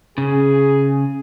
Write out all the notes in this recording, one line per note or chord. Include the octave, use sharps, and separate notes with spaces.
C#3 G#4